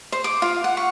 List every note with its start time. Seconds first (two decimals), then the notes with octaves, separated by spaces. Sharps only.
0.12 C5
0.24 D6
0.42 F4
0.64 F#5
0.77 C#6